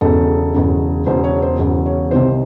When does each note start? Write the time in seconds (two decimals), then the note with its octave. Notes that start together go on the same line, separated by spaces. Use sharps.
0.01 E1 E2 C#3 A4
0.54 E1 E2 C#3
1.06 E1 E2 C#3 C5
1.24 C#5
1.42 C5
1.59 E1 E2 C#3
1.86 C#5
2.11 C2 C3 D#3 C5